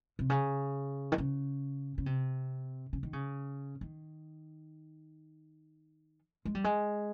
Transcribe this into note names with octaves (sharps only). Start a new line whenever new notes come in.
C3
C#3
D#3
C#3
C#3
C3
C#3
D#3
C#3
D#3
G#3
G3
G#3